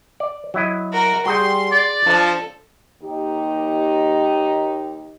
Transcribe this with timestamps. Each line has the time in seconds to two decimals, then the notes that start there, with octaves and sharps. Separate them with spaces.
0.20 D5
0.54 F#3 E4 D#5
0.93 F#4 A#4
1.26 G3 F#4 G#4 G5 C6
1.72 D5
2.06 F3 D4 A4
3.02 D#2 D#4 G4